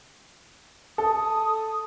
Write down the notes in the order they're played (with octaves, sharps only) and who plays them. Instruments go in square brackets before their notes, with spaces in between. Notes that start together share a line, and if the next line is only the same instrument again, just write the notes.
[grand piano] A4 [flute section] D#6